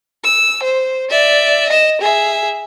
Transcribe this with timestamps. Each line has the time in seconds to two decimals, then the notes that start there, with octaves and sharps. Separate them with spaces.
0.24 E6
0.63 C5
1.10 D5 E5
1.69 D#5 E7
2.01 G#4 E5